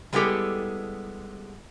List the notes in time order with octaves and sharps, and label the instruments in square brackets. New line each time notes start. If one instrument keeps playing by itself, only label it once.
[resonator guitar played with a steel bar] G3 G#3 B3 E4 G4 A4